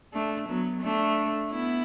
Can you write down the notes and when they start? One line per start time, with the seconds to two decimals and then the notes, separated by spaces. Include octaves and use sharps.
0.13 A3 D4
0.48 F#3 B3
0.82 A3 D4
1.51 B3 E4